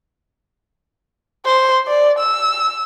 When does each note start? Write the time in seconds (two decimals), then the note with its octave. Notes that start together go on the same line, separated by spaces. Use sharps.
1.45 C5
1.88 D5
2.19 E6